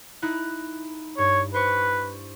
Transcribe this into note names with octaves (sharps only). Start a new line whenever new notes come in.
D#4 E4 F#6
G2 C#5
B4 C5 C#6